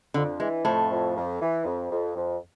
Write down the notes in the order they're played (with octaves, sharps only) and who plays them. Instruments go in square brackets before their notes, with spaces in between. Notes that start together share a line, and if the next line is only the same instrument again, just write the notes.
[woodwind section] F2 [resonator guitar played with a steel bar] D3
[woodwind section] E3 [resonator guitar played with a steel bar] G#3
[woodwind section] F2 [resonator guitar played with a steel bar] A2 A3
[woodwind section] F2
F2
E3
F2
F2
F2